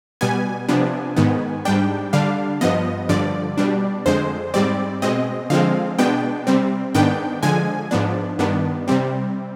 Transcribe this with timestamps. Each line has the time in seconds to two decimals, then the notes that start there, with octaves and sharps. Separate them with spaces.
0.21 B2 G3 B3 G#5
0.68 C3 F3 B3 D4
1.17 G#2 D#3 B3
1.65 G#2 G3 D4 G5
2.13 D3 G3 D4 F5
2.61 G2 F3 B3 D#5
3.09 G2 D3 F3 D5
3.57 B2 G3 D4
4.06 F2 D3 G#3 C5
4.54 G#2 G3 C4 D5
5.02 B2 G#3 C4 D#5
5.50 D3 F3 G#3 C4 F5
5.98 B2 G#3 B3 D4 G5
6.47 C3 G3 C4
6.95 G#2 D#3 B3 D4 G5
7.43 D3 F3 G#3 G#5
7.91 G#2 F3 B3 D4
8.39 G2 D#3 B3 D4
8.88 C3 G3 C4